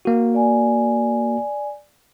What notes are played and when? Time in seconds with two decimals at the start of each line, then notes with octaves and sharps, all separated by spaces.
0.05 A#3 F#4
0.34 D5 G#5